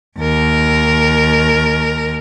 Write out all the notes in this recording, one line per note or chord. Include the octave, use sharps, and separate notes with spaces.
D#2 A#4